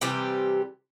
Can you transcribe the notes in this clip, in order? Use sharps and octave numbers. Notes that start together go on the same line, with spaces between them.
C3 E3 G3 G4